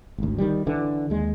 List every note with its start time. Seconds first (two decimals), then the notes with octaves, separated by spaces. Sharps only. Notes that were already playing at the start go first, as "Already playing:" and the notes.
0.18 G#1 D2
0.38 D#3 G3
0.66 D3 E3
1.10 D#2 G#3